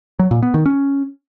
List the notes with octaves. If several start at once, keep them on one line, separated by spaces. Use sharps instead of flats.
F#3
A#2
B3
D#3
C#4